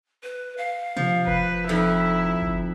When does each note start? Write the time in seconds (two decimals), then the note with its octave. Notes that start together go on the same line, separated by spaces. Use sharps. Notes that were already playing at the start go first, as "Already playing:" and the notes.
0.23 B4
0.58 F5
0.97 C3 F3
1.27 F1 B4
1.69 F2 D#4 E4
2.42 G1